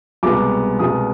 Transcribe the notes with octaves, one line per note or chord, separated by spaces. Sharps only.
C2 B2 G#3 B3 D6
C2 B2 G#3 B3 D#6